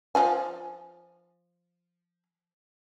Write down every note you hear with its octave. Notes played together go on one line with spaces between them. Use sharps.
F3 F4 G#5